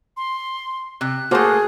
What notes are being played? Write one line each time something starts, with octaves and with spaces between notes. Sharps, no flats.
C6
C3 F#6
A3 A#3 F#4 G#4 C5 A5